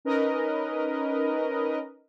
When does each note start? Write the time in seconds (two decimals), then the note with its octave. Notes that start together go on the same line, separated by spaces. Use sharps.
0.05 C#4 D#4 A#4 B4 D#5